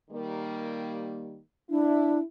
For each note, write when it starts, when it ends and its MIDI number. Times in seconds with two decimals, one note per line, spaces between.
0.11 1.38 51
0.11 1.38 55
0.11 1.38 58
1.70 2.19 62
1.70 2.22 64